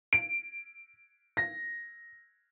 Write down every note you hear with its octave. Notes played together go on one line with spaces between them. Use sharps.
D7
A#6